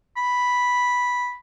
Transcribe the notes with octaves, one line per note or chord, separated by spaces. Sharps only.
B5